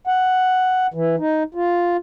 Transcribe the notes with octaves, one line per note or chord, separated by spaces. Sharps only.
F#5
E3
D#4
F4